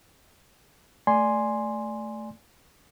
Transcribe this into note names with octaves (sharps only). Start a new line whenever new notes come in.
A3 D5 G#5 C6